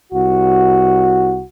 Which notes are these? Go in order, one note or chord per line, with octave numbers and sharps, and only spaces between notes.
C2 F#4